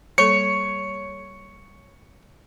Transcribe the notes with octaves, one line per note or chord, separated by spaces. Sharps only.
G3 A#3 A4 C#5 C#7